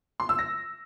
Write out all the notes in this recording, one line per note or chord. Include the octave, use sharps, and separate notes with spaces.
C6
E6
A#6